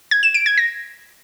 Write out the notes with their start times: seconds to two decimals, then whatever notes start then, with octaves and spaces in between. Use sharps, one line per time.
0.11 G#6
0.23 E7
0.34 D7
0.46 G#6
0.58 A#6